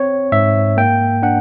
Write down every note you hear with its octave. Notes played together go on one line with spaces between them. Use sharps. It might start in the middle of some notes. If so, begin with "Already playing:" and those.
Already playing: C4 C#5
G#2 E5
A#3 G5
D4 F#5